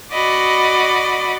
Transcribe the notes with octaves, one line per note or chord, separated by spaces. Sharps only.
F#4 D5 D#5 B5